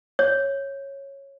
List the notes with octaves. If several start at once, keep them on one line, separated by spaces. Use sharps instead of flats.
C#5